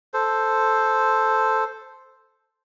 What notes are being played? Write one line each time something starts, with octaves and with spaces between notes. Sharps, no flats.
A4 C5